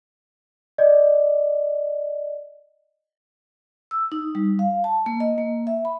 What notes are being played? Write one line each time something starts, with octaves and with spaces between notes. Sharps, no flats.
D5 D#5
E6
D#4
G3
F5
A5
A#3
D#5
A#3
E5
B5